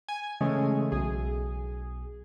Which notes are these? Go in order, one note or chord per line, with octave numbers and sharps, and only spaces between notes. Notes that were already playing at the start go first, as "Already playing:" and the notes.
G#5
C#3 E3 G#3 A3 C#4
B1 G#4